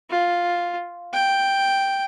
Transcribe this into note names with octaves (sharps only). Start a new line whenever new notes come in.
F4
G5